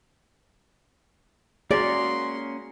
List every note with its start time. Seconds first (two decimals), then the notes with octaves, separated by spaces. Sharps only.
1.71 A#3 C#4 F#4 G#4 A#4 D5 C6